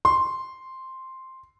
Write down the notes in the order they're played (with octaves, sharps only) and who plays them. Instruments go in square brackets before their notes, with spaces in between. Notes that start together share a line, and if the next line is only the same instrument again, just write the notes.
[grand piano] C6